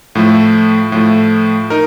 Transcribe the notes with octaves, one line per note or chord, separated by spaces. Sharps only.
A2 F3 A3
A2 F3 A3
D#4 A#4